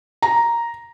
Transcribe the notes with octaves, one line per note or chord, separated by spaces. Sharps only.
A#5